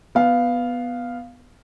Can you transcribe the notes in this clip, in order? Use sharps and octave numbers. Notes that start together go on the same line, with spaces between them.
B3 F5